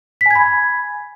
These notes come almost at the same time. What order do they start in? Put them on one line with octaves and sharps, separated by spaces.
B6 G#5 G#6 B5